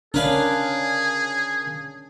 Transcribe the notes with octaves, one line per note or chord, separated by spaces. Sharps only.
C#4 D4 G#4 A#4 B4 F5